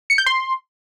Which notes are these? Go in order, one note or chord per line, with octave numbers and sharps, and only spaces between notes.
C#7
G6
C6